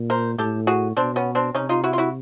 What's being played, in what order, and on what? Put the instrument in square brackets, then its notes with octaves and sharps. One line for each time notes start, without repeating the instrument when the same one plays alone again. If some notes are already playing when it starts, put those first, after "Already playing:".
Already playing: [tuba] A#2
[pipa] A#4 C5
[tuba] A2 [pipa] G4 A4
[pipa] F#4 G#4
[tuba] B2 [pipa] C4 D4
[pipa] B3 C#4
C4 D4
[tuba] C3 [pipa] C#4 D#4
[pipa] D#4 F4
E4 F#4
F4
E4 F#4